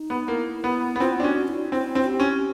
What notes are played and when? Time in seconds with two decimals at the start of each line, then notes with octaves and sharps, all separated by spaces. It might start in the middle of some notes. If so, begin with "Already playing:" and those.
Already playing: D#4
0.10 B3
0.27 A#3 E4
0.64 B3
0.96 B3
1.00 C4 F4
1.20 D4
1.23 C#4 F#4
1.48 E4
1.72 C4 E4
1.95 C4
2.08 G4
2.20 C#4